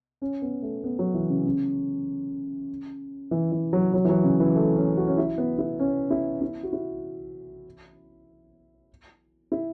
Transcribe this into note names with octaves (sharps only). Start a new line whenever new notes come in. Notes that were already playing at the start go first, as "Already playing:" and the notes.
C#4
B3
A3
B3
F#3
E3
C#3
C#3
E3
E3
F#3
F#3
E3
F#3
C#3
E3
A3
C#4
F#4
C#4
E4
B3
E4
C#4
E4
E4
F#4
E4
E4